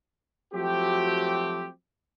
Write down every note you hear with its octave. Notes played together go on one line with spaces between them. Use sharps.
F3 F#3 A3 C4 F#4 G4